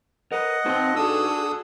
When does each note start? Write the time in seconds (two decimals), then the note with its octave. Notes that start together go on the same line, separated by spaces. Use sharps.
0.32 A#4 B4 D#5 F#5
0.66 C4 D#4 B4 A5
0.96 D4 F#4 G#4 A4 D#6 E6